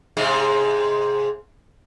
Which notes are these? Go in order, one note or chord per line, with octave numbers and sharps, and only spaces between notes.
G#2 C3 G#3